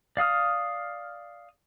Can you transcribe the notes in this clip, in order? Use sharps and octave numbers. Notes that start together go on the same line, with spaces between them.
D5 F5 D#6 F6